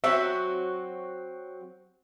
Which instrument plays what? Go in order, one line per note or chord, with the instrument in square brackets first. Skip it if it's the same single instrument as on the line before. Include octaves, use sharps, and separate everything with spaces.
[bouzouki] F#3 C4 F#4 [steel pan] E5